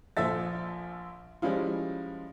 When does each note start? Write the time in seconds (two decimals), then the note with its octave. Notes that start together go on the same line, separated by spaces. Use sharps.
0.17 A#1 F3 A4 E5 A6
1.42 F3 G3 G#3 C#4 E4 F4